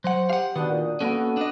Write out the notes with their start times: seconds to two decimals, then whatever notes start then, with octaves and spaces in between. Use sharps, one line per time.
0.04 F#3 C5 F#5
0.30 G4 F5 F#5
0.56 D#3 B3 D4 F#4 D#6
0.70 A#2
1.01 A#3 B3 C#4 F#4 A4
1.37 D4 D#5 F#5